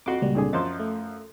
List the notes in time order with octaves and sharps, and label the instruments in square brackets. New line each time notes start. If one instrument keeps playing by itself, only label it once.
[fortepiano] F2 F#4 [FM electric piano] C6 D6
[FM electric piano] C#2 A#2 G3
[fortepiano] G#1 D3 G#4
[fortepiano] F#2 F3 C5 [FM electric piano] D#5 A6
[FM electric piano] A3